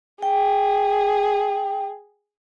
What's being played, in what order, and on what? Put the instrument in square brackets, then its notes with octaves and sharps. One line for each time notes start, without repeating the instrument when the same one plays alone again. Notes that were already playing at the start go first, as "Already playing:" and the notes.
[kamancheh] G#4 [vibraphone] G5